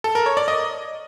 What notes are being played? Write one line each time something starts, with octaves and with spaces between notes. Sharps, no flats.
A4
A#4
C#5
D5
D#5